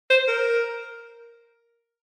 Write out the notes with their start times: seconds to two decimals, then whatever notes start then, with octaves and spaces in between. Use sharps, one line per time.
0.10 C5
0.28 A#4